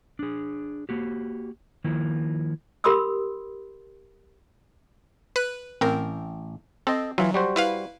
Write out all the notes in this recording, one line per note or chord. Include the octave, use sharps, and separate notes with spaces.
D4 G#4
A#3 F#4 G4
D#3 F3 A#3 E4
G4 A#4 B5 C6 D#6 E6
B4 F#6
A1 C4 A#4 G5
C4 A4 D#5
E3 F#3 F4
G3 F#4 C5
E4 B4 F5